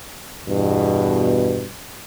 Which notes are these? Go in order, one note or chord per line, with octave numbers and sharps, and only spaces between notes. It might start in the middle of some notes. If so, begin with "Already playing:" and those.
E2 G2 B2